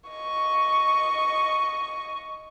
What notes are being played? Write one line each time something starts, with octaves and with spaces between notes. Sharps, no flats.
D#5 C#6